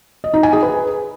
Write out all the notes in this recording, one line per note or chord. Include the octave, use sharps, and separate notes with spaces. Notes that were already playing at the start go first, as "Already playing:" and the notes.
D#5
D#4
G#5
G#4
B4